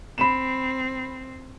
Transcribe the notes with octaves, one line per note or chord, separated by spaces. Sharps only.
C4 B5 E7